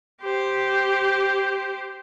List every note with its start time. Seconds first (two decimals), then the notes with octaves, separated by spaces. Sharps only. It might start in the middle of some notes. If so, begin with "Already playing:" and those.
0.22 G4 C5